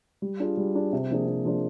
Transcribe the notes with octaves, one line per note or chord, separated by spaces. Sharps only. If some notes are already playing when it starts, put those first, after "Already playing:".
G3
D4 F4 G#4
G3
D4 F4 G#4
C3
F3 A#3 D4 G#4
C3
F3 A#3 D4 G#4